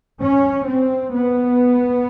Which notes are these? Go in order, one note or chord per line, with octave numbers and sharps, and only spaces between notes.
C#4
C4
B3